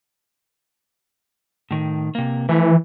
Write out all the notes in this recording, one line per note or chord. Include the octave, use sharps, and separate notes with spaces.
A2 D#3
C3 A#3
E3 F3 A3